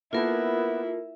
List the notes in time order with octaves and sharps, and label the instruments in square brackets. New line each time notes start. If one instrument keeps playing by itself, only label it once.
[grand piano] A#3 A4 [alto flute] B3 [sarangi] E4 [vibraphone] F4 A#4